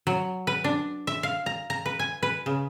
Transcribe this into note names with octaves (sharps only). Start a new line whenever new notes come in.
F#3
B4
D4
E5
F5
A#5
A#5
B4
G#5
B4
C#3